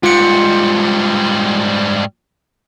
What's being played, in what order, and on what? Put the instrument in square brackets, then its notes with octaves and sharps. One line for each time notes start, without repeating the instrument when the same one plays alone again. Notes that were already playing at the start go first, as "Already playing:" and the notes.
[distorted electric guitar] G#2 G3 [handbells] F4 C#7